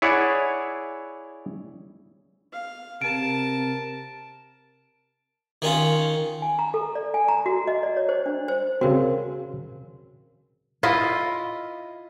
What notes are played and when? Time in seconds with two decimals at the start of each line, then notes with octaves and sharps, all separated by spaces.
0.02 E4 G#4 C#5 D5 F#5
2.52 F5
3.02 C3 A#4 A5 D7
5.62 D#3 C#4 F4
6.42 G#5
6.59 A#5
6.74 A4
6.95 D5
7.14 G#5
7.28 A#5
7.46 F#4
7.67 D#5
7.83 D5
7.97 C#5
8.09 C5
8.26 D4
8.48 C5
8.81 C#3 C4 F#4 A#4
10.83 E4 F4 D#5